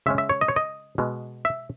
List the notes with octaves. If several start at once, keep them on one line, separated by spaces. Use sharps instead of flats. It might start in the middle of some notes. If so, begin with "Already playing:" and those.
C#3 G#3 C#4 E5
E5
C#5
D#5
C#5
D#5
B2 G#3 B3
E5